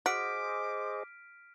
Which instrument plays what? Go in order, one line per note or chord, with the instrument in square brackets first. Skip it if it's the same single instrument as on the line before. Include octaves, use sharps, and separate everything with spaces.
[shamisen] F#4 [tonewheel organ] G#4 C5 D#5 [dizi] D6 [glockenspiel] F6 B6 D7